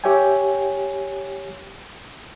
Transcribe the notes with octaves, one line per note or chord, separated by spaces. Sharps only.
G4 C#5 E5 G5 G#5